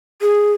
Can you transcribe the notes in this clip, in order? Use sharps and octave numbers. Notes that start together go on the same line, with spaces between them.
G#4